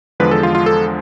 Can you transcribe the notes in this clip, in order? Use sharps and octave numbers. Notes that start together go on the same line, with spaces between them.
E2 D3 F3 G#3 B4
A4
F4
F4
A4